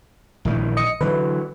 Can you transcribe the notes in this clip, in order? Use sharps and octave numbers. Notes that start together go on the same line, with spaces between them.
A#1 D#3 E3
D#5 D#6 C#7
D3 E3 F#3 B4